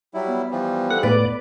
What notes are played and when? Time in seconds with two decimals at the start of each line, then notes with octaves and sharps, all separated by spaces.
0.14 F#3 G3 E4
0.27 B3
0.51 E3 F3 G3
0.91 A4 F#5
1.03 A2 B3 B4 D5